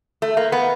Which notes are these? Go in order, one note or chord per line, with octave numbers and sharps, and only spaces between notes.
A3
A#3
B3